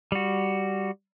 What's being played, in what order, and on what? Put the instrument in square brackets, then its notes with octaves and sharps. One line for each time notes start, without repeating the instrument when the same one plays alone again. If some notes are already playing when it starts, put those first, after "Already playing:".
[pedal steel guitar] G3 F#4